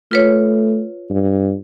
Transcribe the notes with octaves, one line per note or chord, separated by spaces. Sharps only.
A3 F4 B4 C#5
G2